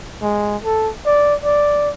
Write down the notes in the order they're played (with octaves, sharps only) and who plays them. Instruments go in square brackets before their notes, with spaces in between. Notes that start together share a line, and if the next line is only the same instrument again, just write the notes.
[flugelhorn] G#3
A4
D5
D5